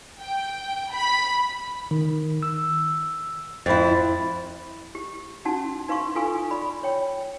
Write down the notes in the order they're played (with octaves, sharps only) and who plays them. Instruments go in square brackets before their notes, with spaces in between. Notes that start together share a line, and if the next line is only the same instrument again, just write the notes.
[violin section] G5
B5
[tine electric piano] D#3
E6
[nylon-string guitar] F2 E4 [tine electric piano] B5 A6
[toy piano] G4
C#4 D#4 F#4 F#5 A5
D#4 B4 F5 C6 C#6
F4 A4 B4 F5 G#5 C#6
D5 B5
C#5 G5